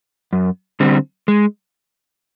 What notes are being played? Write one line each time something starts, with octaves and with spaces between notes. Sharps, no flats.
F#2
D3 G3 C4
G#3